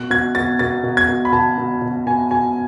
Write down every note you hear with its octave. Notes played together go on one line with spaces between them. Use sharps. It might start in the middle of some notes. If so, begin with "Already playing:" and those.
Already playing: B2 F#6
B2 G#6
B2 A6
B2 A6
B2
G#6
B2
B5
B2 A5
B2
B2
B2 G#5
B2 G#5